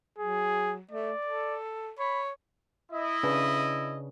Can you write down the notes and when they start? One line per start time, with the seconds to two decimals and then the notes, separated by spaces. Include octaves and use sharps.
0.19 F#3 G#4
0.91 A3 D5
1.25 A4
1.99 C#5 B5
2.92 E4 D#5
3.23 C#3 D4 B4